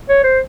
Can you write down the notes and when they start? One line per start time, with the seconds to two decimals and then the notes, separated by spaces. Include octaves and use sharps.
0.09 C#5
0.23 C5